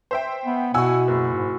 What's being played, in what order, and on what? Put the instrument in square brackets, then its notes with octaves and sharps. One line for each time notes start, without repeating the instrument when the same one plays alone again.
[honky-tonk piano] C5 E5 G5
[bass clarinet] B3
[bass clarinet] B2 [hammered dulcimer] E4 F#4 [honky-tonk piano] F#5 G#5 E6
[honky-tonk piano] F#1
[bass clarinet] G#2